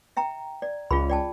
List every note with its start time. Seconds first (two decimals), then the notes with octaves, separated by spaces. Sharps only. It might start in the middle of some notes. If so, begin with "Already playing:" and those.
0.17 E5 G5 A#5
0.62 D5
0.91 C#2 F4 G#4 B5
1.10 D5 G5 A5